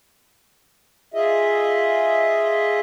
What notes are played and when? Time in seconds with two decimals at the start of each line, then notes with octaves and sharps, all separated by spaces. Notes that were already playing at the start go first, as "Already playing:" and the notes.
1.14 F4 G#4 D#5 E5